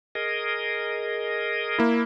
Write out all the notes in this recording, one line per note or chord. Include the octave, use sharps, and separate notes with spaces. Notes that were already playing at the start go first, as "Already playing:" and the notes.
G#4 A#4 D#5
A#3 E4